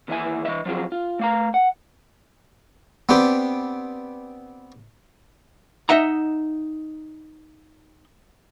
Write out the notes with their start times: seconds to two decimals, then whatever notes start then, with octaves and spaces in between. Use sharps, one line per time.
0.08 D#2 E3 E4 G#4 E5 G#5
0.45 E3 F3 D#5 E5
0.66 F3 F#3 C4 F4 G#4
0.92 F4
1.19 A3 F5 A#5
1.54 F#5
3.09 B3 C4 D4 G4
5.89 D#4 D#5 E5 F#5 A#5